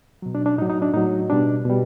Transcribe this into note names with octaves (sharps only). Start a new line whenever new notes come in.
B2 F#3
D4
D4
A2 F#3 D#4
D#4
D4
A2 F#3 D#4
B2 G3 D4
B2 G3